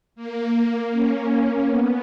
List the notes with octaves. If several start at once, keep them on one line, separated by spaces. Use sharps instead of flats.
A#3
C#4
B3